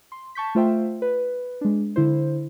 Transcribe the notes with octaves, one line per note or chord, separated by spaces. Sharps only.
C6
A5 C#6 G6 B6
A3 F4 C5 E5 G5
B4
G#3 D4
D3 E4 C5